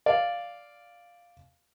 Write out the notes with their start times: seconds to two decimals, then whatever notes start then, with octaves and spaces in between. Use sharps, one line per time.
0.06 D5 F5